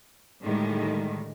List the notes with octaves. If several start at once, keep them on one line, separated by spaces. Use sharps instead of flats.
A2 D3 D#3 G3 G#3